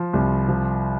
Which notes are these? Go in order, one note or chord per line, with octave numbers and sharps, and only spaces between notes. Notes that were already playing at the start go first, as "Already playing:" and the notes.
Already playing: F3
C2
F3